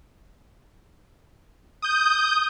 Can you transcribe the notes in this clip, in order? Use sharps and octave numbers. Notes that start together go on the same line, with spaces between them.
D#6 G6